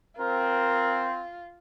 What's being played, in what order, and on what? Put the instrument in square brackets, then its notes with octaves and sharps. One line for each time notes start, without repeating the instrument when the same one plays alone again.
[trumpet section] C4 [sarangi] F4 [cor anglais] A#4